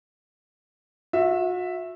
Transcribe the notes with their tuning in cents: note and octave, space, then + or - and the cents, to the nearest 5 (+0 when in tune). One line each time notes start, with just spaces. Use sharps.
F#4 -40 E5 +0